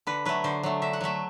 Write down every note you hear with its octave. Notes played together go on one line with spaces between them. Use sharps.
D3 B4
F#3 A3 B4
D3 C5
F#3 A3
D3 E5
F#5
F#3 A3 E5